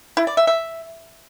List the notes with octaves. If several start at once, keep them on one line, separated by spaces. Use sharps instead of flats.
E4
D5
E5
E5